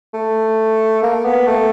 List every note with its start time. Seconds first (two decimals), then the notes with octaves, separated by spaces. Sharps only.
0.14 A3
1.03 A#3
1.25 B3
1.47 A3